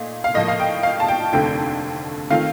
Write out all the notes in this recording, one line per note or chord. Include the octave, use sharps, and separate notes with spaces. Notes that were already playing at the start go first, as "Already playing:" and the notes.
Already playing: A#2 A3 D#4
F5
A2 F3 A#3 D#5
F5
G5
F5
A5
G5
F1 D#2 D3 A3 C4 G5
D#3 A3 C4 F4 F5